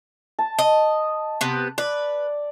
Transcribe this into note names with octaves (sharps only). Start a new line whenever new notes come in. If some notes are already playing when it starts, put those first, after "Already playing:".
A5
D#5
C3 B3
B4 D5